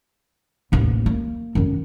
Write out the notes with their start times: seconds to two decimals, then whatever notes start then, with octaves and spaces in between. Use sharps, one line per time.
0.72 A1 D#2
1.06 A#3
1.55 F#2 D#3